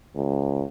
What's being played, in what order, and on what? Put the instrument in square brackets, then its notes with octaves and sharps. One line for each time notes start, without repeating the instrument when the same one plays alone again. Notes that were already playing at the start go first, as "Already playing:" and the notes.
[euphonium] C#2